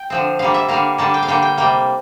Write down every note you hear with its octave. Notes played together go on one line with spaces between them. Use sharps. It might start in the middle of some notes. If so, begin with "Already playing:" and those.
Already playing: G5
D3 F3 C4
D3 G3 A#3 F5
E5
D3 G3 A#3 F5
D3 G3 A#3 A5
G5
F5
D3 G3 A#3 G5
G5
C3 G3 A#3 G5